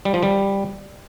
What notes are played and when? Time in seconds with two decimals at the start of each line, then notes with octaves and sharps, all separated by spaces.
0.05 G3
0.14 F3
0.23 G3